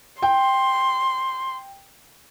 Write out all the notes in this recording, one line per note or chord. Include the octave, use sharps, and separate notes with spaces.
G5 C6